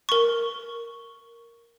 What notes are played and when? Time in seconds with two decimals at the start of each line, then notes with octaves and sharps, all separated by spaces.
0.09 A#4 C#6